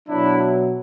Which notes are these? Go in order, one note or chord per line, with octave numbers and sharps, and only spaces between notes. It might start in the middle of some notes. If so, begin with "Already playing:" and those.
B2 F#3 D4 E4